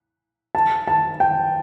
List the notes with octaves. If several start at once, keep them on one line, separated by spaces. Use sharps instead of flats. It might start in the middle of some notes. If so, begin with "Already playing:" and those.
A5
A5
G5